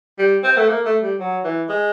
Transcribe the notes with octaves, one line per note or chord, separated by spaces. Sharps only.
G3
C4
A3
A#3
A3
G3
F#3
E3
G#3